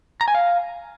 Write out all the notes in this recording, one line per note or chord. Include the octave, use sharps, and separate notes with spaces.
A#5
G#5
F5